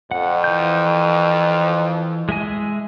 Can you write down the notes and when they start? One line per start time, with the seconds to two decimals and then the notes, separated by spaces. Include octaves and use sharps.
0.11 F2 F#5
0.44 E3 G6
2.29 G#3 E5 G#5